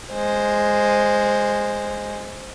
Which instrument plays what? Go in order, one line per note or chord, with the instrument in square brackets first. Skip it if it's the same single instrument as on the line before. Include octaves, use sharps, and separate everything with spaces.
[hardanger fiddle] G#3 C5